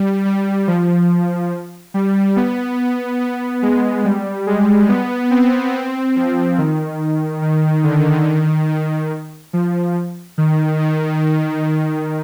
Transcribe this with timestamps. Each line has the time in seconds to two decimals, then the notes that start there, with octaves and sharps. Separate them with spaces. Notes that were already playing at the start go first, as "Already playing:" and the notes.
Already playing: G3
0.25 G3
0.68 F3
1.94 G3
2.36 B3
3.21 B3
3.63 G#3
4.05 G3
4.47 G#3
4.89 B3
5.31 C4
5.73 C4
6.16 F3
6.58 D#3
7.42 D#3
7.84 D3
8.27 D#3
8.69 D#3
9.53 F3
10.38 D#3
10.79 D#3
11.64 D#3